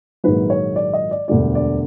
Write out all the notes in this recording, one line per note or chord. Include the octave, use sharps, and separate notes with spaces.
A#1 G#2 D#3 F#3 B4
C#5
D5
D#5
D5
E1 D2 D3 G3 D5
D5